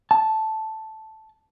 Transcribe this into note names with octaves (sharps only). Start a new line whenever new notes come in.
A5